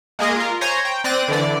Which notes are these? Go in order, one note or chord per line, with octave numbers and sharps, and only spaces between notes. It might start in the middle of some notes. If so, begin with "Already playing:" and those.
G#3 A#3 G#4 D#5
F4 A#4
C5 C#5 G#5 A#5
G5
C4 D5 F#6 A#6 D#7
D3 E3 D5